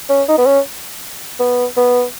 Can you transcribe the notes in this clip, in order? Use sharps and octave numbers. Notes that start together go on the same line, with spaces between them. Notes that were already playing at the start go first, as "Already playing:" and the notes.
C#4
D#4
B3
C#4
B3
B3